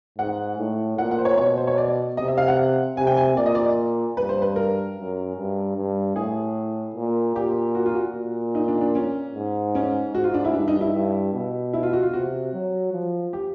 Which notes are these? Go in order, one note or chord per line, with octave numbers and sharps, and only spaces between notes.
G#2 F#5
A2
A#2 F#5
F#5
C5
C#5
B2 C#5
C5
C#5
D5
C3 D#5
E5
F5
F#5
C3 G#5
G5
G#5
A#2 D5
D#5
D5
G2 B4
C5
B4
A#4
F#2
G2
G2
A2 G#4
A#2
A#2 G4
F#4
F4
F#4
A#2
D#4
D4
D4
C#4
G#2
C#4
G#2 F#4
F4
D4
E4
G2 D4
D#4
E4
G2
B2
E4
F4
F#4
F4
C3 F#4
F#3
F3
G4